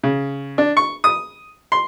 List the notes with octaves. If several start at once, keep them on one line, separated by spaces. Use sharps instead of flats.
C#3
D4
C#6
D#6
C6